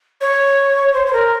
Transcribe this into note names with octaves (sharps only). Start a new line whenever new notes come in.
C#5
C5
C5
A#4